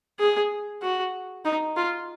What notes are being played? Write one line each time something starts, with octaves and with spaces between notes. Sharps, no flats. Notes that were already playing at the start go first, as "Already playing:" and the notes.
G#4
F#4
D#4
F4